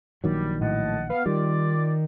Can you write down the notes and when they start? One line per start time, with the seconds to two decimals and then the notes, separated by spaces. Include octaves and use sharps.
0.24 A#1 D#3 F#3 G3
0.61 A2 D#5 F#5 A5
1.10 B3 F5
1.26 D#3 G3 F4 D5